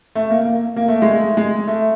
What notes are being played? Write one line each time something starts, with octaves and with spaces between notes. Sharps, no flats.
A3
A#3
A#3
A#3
A3
G#3
A3
G#3
A3